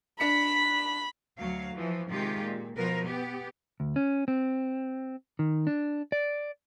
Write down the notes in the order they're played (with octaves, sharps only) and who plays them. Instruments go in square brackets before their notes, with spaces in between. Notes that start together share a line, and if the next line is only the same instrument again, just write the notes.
[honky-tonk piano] D4 C#7 [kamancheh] B5 [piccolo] B6
[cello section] D2 F#3 F5
E3 F3
C3 D#3 G#3 F4 G4
A#2
B2 F3 A#4 B4
B3 G4
[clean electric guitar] D2
C#4
C4
D#3
D4
D5